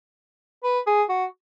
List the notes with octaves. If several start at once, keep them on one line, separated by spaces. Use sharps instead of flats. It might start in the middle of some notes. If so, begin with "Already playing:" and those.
B4
G#4
F#4